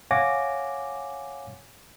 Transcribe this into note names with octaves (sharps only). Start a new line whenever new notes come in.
C#5 F5 F#5 G#5 D6 A#6